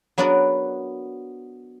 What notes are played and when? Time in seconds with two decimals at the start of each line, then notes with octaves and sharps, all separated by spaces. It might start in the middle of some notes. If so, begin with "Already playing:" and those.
0.18 F#3 B3 D4 F#4 A#4 D5